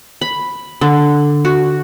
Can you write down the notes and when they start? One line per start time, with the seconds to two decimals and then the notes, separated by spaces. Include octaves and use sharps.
0.21 B5
0.81 D3
1.45 F#4